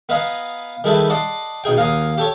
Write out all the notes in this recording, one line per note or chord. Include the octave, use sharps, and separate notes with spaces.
B3 B4 D#5 F5 G#5 A#5
D#3 G3 G#4 A4 B4 E5
D5 D#5 F#5 A5 C6
B2 D#4 G#4 G5
D#2 F5 F#5 G#5 A#5 D#6
G4 A4 C#5